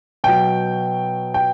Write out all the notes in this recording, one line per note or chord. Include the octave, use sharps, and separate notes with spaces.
B2 F#3 G5
G5